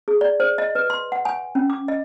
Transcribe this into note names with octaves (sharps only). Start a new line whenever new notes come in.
G#4
D5
C5
D#5
B4
C6
F#5
G#5
C#4
D6
D#5